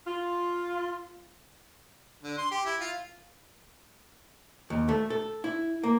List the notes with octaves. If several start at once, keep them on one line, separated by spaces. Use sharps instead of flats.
F4
D3
C6
G4
E4
F4
D#2
A3
A4
E4
A#3